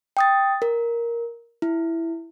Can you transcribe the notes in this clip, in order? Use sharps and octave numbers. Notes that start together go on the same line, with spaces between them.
G5 D#6 A6
A#4
E4